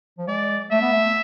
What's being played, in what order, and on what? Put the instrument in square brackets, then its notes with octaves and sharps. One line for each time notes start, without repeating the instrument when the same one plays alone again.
[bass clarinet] F3
[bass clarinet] G#3 [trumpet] D5
[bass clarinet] A3 [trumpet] E5
[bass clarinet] B3
A3